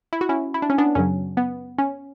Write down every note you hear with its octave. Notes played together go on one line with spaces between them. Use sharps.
E4
F#4
C#4 E4
E4
D4
C#4
B3 D4
F#2 C#3 F#3 C#4
B3
C#4